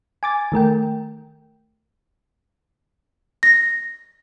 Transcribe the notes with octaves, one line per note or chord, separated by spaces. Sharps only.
G#5 D6 A6
D#3 A3 A#4 G5
A#6